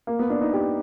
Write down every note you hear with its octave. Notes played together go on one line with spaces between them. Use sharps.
A#3
B3
D4
D#4
G4